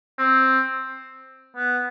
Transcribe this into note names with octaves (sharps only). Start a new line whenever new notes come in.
C4
B3